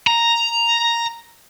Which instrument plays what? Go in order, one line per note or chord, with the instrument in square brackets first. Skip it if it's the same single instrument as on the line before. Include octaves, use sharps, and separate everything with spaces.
[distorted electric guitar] A#5